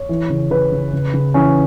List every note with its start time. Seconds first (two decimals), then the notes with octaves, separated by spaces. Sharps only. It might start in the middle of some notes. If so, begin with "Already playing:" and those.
Already playing: C#5
0.09 E3
0.30 C#3
0.51 C#3 B4
0.72 C#3
0.93 C#3
1.14 C#3
1.34 E3 C#4